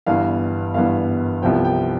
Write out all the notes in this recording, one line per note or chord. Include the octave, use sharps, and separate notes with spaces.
G1 G2 E3 B3 F5
G1 G2 E3 B3 F5
C2 C3 F3 B3 G5
G5